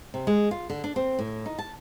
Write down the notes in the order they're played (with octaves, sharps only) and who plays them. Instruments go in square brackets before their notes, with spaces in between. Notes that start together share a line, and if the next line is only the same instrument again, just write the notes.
[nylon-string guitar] C3
G#3
F4
D3
D4
C4
A2
D#4
A5